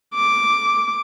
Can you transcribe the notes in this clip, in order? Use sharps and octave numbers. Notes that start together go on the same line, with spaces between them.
D6